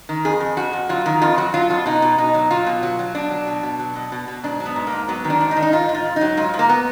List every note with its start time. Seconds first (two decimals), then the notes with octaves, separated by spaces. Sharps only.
0.09 D#3
0.25 F2 G#4
0.40 F2
0.57 F2 F#4
0.73 F2
0.89 F#3 F4
1.06 D#3
1.22 F2 F4
1.38 F#3 F#4
1.54 F#3 F4
1.70 F2 F4
1.86 B2 D#4
2.02 B2
2.18 B2 D#4
2.34 F#3
2.51 F#3 F4
2.66 B2
2.83 F#3
2.99 F#3
3.15 B2 D4
3.31 F#3
3.47 B2
3.63 B2
3.79 F#3
3.96 B2
4.12 B2
4.28 B2
4.44 G#2 D4
4.60 F#3
4.66 B3
4.76 G#2
4.87 A#3
4.92 G#2
5.08 F#3 B3
5.24 D#3
5.30 D4
5.41 G#2
5.51 D#4
5.57 D#3
5.62 D#4
5.73 G#2 F4
5.89 G#2
5.94 F4
6.05 G#2
6.16 D#4
6.21 F#3
6.37 G#2 F4
6.54 G#2
6.59 A#3
6.69 B3